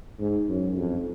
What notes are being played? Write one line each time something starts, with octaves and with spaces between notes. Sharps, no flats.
G#2
F#2
F2